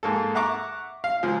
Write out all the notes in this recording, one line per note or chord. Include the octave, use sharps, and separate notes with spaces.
G#2 A#3 A4
E5 F#5 A#5 C#6 D6
F5
C#2 F3